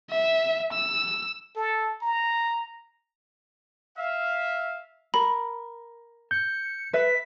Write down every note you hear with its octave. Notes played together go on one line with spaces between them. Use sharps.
E5
E6
A4
A#5
E5 F5
A#4 B5
G6 C#7
B4 E5 B6